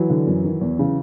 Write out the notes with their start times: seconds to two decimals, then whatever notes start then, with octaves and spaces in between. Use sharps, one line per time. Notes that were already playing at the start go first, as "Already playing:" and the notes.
Already playing: E3 F#3
0.10 D3
0.27 F#2
0.44 D#3
0.61 E2
0.79 C#3 E3